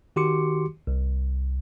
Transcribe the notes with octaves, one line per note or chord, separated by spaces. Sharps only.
D#3 F#4 G4 C6 D6 C#7
C2